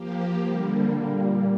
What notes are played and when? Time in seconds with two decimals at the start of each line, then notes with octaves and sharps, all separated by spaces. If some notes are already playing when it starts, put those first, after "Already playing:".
Already playing: F3 A#3 G4
0.42 D3 G3 A#3
0.94 A#2 G3 A#3